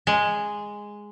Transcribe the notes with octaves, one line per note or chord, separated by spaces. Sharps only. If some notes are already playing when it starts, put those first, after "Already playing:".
G#3